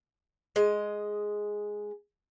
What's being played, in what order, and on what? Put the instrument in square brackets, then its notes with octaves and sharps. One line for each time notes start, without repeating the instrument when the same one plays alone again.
[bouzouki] G#3 D#5